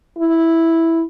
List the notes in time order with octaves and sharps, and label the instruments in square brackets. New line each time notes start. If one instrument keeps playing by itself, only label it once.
[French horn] E4